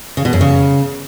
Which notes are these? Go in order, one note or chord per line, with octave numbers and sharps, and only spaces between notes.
C#3
B2
F#2
C#3